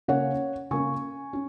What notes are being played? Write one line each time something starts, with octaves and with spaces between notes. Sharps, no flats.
C#3 A#3 C#4 C#5 F#5
C#3 A#3 C#4 G#5 C#6
C#4